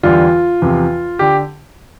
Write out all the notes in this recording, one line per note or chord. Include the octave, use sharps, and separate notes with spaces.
E2 D3 G3 F4
E2 C3 F3
D3 G4